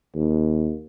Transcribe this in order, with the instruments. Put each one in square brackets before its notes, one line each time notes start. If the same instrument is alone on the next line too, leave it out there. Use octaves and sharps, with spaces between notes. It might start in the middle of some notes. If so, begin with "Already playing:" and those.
[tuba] D#2